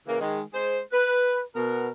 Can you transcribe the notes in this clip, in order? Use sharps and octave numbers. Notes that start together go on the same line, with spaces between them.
C#3 E3 A#3
D#3 G#3
G#3 G#4 C5
B4
B2 B3 A#4